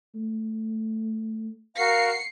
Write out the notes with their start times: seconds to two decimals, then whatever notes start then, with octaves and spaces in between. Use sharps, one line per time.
0.15 A3
1.76 F#4 A#4 F5 C7 C#7